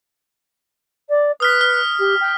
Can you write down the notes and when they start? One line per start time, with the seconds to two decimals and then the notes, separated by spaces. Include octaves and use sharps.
1.09 D5
1.40 B4 D#6 F6 B6
1.61 F6
1.99 G4
2.21 G5